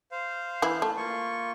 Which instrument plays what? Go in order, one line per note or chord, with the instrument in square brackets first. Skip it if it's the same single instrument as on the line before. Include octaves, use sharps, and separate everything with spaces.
[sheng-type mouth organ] C5 F5
[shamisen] E3 E4
A3
[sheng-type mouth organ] A#3 F4 C#6